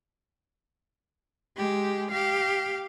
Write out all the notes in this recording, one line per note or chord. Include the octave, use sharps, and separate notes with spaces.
G#3 G4
G4 F5